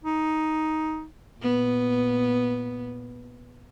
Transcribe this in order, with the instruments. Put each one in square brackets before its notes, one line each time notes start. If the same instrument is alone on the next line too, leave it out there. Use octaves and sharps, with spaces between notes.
[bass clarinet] D#4
[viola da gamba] A#2 B3